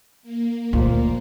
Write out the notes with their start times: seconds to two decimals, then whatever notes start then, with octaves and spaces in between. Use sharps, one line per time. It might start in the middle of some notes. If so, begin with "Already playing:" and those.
0.23 A#3
0.73 D2 A#2 F3